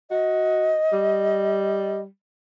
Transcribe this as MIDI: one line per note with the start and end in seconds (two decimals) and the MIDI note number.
0.11 0.76 66
0.11 2.01 75
0.93 2.06 55